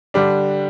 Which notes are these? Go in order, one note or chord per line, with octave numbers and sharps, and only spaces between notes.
D3 G3 D4